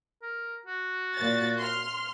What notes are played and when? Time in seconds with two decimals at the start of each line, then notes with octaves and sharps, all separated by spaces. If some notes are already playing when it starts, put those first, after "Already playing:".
0.23 A#4
0.66 F#4
1.16 A#2 A6
1.59 C6 F6